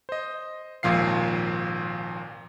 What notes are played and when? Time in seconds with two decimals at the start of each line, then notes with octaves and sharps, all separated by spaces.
0.09 C5 D#5
0.83 G#1 D#2 A#2 F3 F5 C7